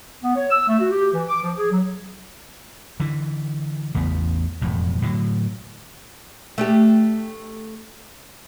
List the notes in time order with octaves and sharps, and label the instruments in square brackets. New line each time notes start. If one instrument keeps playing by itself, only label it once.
[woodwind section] B3
C#5
E6
A3
F#4
G4
E3
D6
F3
G#4
F#3
[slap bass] D3 E3
A1 E2 C#3 B3
E1 F2 A2
A2 D3 E3 F#3
[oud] A3 D4 G4